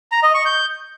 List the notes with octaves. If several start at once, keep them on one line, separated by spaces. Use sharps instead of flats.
A#5
D#5
C#6
G6